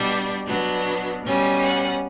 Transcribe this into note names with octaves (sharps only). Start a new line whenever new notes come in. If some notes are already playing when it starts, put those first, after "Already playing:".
Already playing: B2 G3 D4
B2 F#3 B3 D4
B2 G3 C#4
F#5